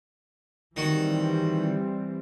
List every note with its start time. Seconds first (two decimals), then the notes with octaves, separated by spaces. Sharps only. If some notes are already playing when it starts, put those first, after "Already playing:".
0.76 D#3 E3 G3 C4 F#4